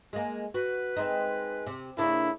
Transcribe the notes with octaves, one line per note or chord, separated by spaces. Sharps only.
G#3 A#3
F#4 B4
G#3 C4 D#4
C3
C#3 A#3 D4 E4